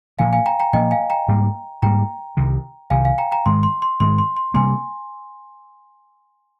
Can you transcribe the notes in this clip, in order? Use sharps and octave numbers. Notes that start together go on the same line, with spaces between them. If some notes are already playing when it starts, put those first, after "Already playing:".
A#2 F3 A#3 F5 G#5
F5 G#5
G5 A#5
G5 A#5
A#2 F3 A#3 D#5 G5
F5 G#5
G5 A#5
G#2 G3 A#3
G#2 G3 A#3 G5 A#5
C2 C3 D#3
C2 C3 D#3 F5 G#5
F5 G#5
G5 A#5
G5 A#5
G#2 D#3 G#3 C6
C6
C6
G#2 D#3 G#3 C6
C6
C6
C3 G3 A#3 G#5 C6